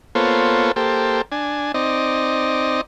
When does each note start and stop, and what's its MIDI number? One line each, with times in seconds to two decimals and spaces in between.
0.15 0.72 58
0.15 0.72 59
0.15 0.72 65
0.15 0.72 69
0.15 0.72 72
0.15 0.72 73
0.76 1.22 58
0.76 1.22 67
0.76 1.22 69
0.76 1.22 72
1.32 1.72 62
1.32 1.72 80
1.74 2.81 60
1.74 2.81 63
1.74 2.81 74
1.74 2.81 75